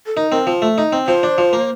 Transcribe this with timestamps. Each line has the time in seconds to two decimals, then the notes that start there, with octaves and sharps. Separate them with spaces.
0.06 A4
0.17 D#4 A#4
0.31 C4 A#4
0.47 F3
0.62 A3
0.78 D#4
0.93 C4
1.07 F3 C5
1.23 D4
1.38 F3
1.53 A#3